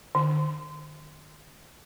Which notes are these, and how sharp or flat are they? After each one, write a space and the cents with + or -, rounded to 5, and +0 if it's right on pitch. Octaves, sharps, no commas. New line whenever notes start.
D#3 -40